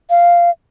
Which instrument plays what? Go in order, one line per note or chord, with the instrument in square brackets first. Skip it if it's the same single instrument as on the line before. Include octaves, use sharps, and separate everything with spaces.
[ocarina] F5